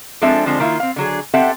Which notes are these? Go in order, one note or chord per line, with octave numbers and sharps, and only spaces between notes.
F3 G#3 C4 D4 A4 E5
D3 F3 G3 G#3 C4 D4
D#3 A#3 E4 F4
C4 F5
D3 F#3 G#4
C4 G4 A4 E5 F#5